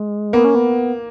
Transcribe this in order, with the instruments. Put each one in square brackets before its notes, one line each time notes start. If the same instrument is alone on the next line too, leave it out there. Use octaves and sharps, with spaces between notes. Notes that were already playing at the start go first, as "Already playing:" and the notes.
Already playing: [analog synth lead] G#3
[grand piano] A#3 [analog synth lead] B3
[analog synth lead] C#4
B3